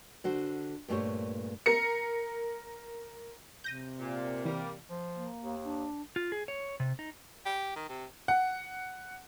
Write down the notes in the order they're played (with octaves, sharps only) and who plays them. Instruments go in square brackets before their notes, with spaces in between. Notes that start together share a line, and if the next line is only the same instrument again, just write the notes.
[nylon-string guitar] D3 F#4 C5
G2 A#2 A3 G#4 C5 C#5
[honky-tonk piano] A#4 C#7
[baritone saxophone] C3 [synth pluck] G6 A#6 D#7
[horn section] A#2
[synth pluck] E3 [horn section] G3 A#3
[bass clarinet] F3
[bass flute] A#3
[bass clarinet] D#2
[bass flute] D4
[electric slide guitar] F4
G#4
C#5
C3
D#4
[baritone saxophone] G4
D#3
C3
[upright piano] F#5